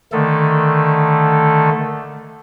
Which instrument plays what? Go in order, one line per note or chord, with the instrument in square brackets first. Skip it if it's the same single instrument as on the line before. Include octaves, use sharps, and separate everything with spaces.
[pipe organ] D3 D#3 A3 A4